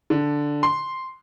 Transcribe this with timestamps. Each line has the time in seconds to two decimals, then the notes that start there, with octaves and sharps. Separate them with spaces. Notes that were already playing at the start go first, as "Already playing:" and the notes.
0.10 D3
0.63 C6